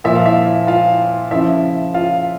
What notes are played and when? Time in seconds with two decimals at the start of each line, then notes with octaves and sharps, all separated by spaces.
0.04 A#2 F3 E5
0.16 F5
0.25 E4 E5
0.67 F4 F5
1.31 C#3 F3 E4 E5
1.94 F4 F5